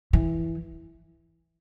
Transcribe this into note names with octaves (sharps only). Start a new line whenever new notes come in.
E3